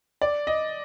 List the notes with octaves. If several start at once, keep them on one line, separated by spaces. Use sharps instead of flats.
D5
D#5